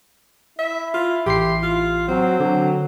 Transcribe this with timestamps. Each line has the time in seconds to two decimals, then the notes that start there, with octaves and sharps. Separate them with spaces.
0.59 E4 E5
0.94 F4
1.26 A1 G4 C6 C7
1.62 F4
2.08 F#3 C4
2.40 D3 F#3